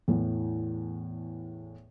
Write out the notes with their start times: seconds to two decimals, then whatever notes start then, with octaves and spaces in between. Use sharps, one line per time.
0.08 E2 A2